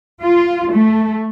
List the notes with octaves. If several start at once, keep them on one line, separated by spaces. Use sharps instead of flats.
F4
A3